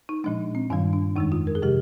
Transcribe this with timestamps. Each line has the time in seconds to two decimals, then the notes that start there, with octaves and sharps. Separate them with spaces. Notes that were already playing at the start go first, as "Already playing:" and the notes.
0.09 D#4
0.24 A#2 F3 G#3 D4
0.55 C4
0.70 G2 D#3 G3 D4
0.93 D4
1.16 F2 D#3 G#3 D#4
1.32 F4
1.47 A#4
1.55 G#4
1.62 C3 F3 G#3 G4